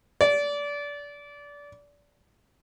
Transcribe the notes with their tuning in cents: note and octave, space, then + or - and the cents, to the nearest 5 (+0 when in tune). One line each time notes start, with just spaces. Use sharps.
D5 -25